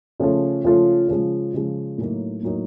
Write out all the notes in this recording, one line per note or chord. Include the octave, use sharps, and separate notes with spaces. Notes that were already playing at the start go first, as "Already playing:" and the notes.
C#3 F3 A3 C#4 F4
C#3 F3 A3 C#4 F4
C#3 F3 G#3
C#3 F3 G#3
A2 F#3 A#3 D#4
A2 F#3 A#3 D#4